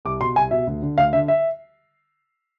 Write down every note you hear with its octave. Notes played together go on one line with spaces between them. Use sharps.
C2 D6
B2 C6
C2 G#5
B2 E5
D2
D3
D2 F5
D3 E5
E5